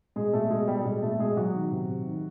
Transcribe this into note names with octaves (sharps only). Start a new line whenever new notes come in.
B2 G#3 G#4
B2 A3 A4
B2 G#3 G#4
B2 G3 G4
A4
B2 G#3 G#4
B2 A3 A4
B2 G#3 G#4
B2 F#3 F#4
D#3
C3
C3
D#3